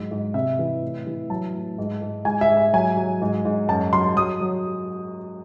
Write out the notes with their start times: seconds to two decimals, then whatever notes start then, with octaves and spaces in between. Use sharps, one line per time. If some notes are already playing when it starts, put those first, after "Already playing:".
Already playing: G#2 F#3
0.11 G#2
0.34 C3 E5
0.59 E3
0.82 A2
1.07 E3
1.30 F#3 A5
1.54 A2
1.78 G#2
2.02 G#2
2.25 G#2 G#5
2.41 E5
2.49 G#2
2.57 E5
2.73 F#3 G#5
2.97 F#3
3.22 G#2
3.45 G#2
3.68 F#2 A5
3.93 F#3 C6
4.16 F#3 D#6
4.41 F#3